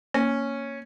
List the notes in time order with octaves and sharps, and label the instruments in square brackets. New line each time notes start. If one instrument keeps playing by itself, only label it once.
[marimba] A#3 [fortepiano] C#4